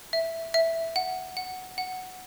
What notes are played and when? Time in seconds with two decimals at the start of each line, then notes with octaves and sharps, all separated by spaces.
0.13 E5
0.54 E5
0.96 F#5
1.37 F#5
1.78 F#5